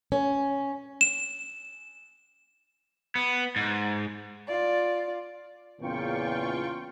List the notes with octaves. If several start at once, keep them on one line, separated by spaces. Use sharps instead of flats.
C#4
E7
B3
G#2
F4 D5
E2 A#2 C#3 F4 G5 C#6